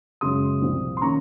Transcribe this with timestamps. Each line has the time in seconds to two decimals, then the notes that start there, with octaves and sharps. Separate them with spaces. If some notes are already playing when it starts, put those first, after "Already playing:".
0.21 F#2 C#3 G#3 C#4 C6 D#6
0.62 C2 A#2 F3 C4
0.97 C6
1.02 D#3 A#3 C#4 A#5 C#6